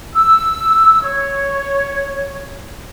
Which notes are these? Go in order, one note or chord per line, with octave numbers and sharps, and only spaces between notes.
E6
C#5